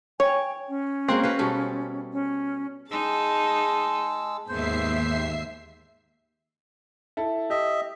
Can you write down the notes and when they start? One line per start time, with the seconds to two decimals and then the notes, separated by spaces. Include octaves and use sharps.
0.20 C#5 G5 G#5
0.68 C#4
1.08 G#3 A#3 C4 F#4
1.23 F#4 B4 F5
1.39 B2 G3 A4
2.13 C#4
2.91 G#3 D#4 G#4 A5 E6
4.48 D#2 G#2 D#3 B3 G#4 C5 E5 C7
7.17 E4 A4
7.50 G4 D#5 E5